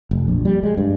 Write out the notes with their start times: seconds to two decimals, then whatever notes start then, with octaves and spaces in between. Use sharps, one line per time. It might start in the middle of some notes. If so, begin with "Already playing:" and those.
0.11 F1
0.28 A#1
0.45 G3
0.63 G#3
0.78 G2